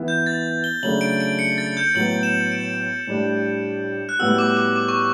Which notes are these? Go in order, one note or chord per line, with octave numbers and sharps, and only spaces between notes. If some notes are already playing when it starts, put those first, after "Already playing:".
Already playing: E3 B3 E4
G6
A6
G7
C#3 F#3 A3 D4 F#7
D7
D7
C#7
A6
G6
A2 F#3 B3 F#7
E7
D7
A2 G3 D4
F#6
A2 G3 B3 F#4 E6
D6
D6
D6
C#6